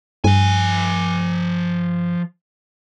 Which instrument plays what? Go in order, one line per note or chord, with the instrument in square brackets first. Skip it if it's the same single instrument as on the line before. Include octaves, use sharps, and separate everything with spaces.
[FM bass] G2 [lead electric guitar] F3 G#5